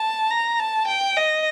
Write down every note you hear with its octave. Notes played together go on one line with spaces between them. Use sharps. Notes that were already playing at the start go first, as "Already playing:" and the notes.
Already playing: A5
A#5
A5
G5
D#5